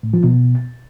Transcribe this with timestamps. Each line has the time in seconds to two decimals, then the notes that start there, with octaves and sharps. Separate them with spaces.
0.03 A2
0.14 F3
0.24 B2